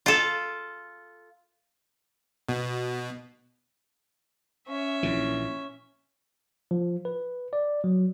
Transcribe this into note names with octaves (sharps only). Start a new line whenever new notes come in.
F4 A4
B2
C#4 E5
A#1 A#2 E3
F3
B4
D5
F#3